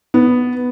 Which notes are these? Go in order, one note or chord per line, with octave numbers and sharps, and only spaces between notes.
B3